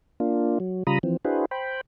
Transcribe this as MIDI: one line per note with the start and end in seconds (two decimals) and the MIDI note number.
0.20 0.59 58
0.20 0.59 62
0.20 0.59 65
0.60 0.83 54
0.87 0.99 49
0.87 0.99 55
0.87 0.99 65
0.87 0.99 82
0.87 0.99 83
0.87 0.99 87
1.03 1.17 52
1.03 1.17 53
1.03 1.17 60
1.25 1.45 62
1.25 1.45 64
1.25 1.45 66
1.25 1.45 68
1.25 1.45 71
1.25 1.45 72
1.51 1.81 72
1.51 1.81 79
1.51 1.81 83